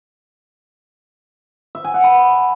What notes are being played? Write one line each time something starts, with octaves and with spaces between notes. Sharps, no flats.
E5
G#5
F#5
B5